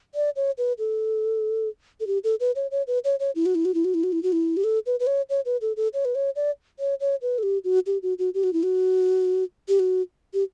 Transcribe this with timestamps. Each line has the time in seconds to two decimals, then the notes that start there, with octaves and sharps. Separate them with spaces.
0.15 D5
0.36 C#5
0.58 B4
0.79 A4
2.00 A4
2.07 G4
2.24 A4
2.40 B4
2.56 C#5
2.71 C#5
2.87 B4
3.04 C#5
3.20 C#5
3.35 E4
3.46 F#4
3.55 E4
3.65 F#4
3.74 E4
3.85 F#4
3.94 E4
4.04 F#4
4.12 E4
4.23 F#4
4.33 E4
4.57 G4
4.64 A4
4.86 B4
5.00 B4
5.07 C#5
5.29 C#5
5.46 B4
5.61 A4
5.77 A4
5.94 C#5
6.05 B4
6.15 C#5
6.36 D5
6.79 C#5
7.00 C#5
7.22 B4
7.38 A4
7.43 G4
7.64 F#4
7.87 G4
8.03 F#4
8.19 F#4
8.34 G4
8.44 F#4
8.53 E4
8.63 F#4
9.68 G4
9.79 F#4
10.34 G4